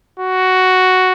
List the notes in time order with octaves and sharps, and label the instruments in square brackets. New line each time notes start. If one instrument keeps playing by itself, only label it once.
[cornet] F#4